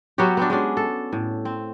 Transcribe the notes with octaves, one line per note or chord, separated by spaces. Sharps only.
F#3 B3 F#4 G4
B3 C4 D4
G#3 C#4 D4
A4
A2
C4